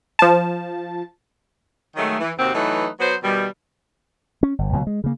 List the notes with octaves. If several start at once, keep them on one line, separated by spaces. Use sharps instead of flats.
F3 A5
D#3 F#3 G#3 A3
E3
D#2 C3 C4 F#4
E3 F#3 A3 D#4 B4
F#3 B3 C5
B2 D#3 G3
C#4
G1
C#2 B2 D#3 F#3
G#3
C#3 A#3